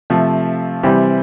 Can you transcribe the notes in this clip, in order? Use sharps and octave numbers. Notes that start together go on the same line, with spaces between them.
C3 F3 A3
C3 E3 G3 C4 E4